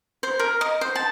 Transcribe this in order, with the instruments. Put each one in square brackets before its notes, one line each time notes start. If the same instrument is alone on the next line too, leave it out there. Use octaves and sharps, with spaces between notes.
[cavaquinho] C5
A#4
D#5
C5
A5